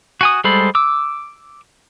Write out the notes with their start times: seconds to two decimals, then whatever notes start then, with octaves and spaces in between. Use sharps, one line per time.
0.21 F#4 G#5 D#6
0.44 G3 G#3 A4 C5 B5
0.75 D6 E6